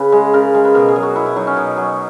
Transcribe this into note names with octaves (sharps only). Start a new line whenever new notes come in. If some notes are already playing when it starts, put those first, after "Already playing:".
Already playing: C#3 B4
G#3
C#3 A#4
G#3 A#4
B4
B2 A#4
G#4
F#3
F#4
B2 E4
E4
F#3 D#4
C#4
B2
F#3